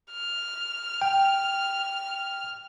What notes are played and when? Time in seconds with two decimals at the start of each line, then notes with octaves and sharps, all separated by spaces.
0.12 F6
1.02 G5